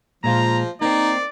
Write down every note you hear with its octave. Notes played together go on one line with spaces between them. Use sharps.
A#2 F3 G#3 F4 A#5
A#3 C4 D#4 D5